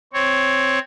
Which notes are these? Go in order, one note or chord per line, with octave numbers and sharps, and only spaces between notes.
C4 C#5